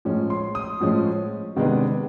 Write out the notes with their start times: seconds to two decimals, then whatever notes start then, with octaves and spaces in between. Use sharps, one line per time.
0.05 A2 F3 G#3 C#4
0.30 C6
0.55 D#6
0.81 A2 F3 G#3 C#4
1.56 C3 D#3 G#3 B3 D4